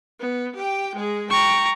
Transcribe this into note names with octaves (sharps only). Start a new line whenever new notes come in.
B3
G4 G5
G#3 G#4
G5 A#5 C#6